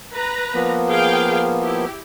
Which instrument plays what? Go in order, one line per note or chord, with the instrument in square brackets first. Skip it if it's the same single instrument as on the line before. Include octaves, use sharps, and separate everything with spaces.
[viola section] B4 A#5
[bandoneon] F3 A#3 B3
[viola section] G#4 F5 G5
E4 G4